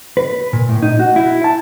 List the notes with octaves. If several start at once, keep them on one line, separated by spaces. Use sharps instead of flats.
B4
A#2
A2
D#4
F#4
E4
A5